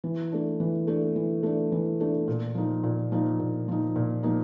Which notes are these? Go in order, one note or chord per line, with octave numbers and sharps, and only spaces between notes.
E3
A3 D4
E3
A3 D4
E3
A3 D4
E3
A3 D4
A#2
F3 A#3 D#4
A#2
F3 A#3 D#4
A#2
F3 A#3 D#4
A#2
F3 A#3 D#4